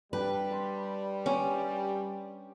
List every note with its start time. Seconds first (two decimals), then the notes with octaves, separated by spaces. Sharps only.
0.13 G3 B3 D4 B4 G5
0.51 A5 C6
1.26 C#4 G4